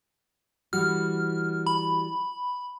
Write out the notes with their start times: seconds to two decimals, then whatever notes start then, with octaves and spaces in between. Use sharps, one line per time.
0.73 E3 G3 F#4 F6
1.67 B5